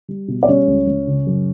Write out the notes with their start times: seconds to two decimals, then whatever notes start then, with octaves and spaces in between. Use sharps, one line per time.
0.08 G3
0.28 B2
0.43 D5
0.48 G3 C#4 C#5
0.68 C#2
0.87 C#2
1.07 C#3
1.27 F#2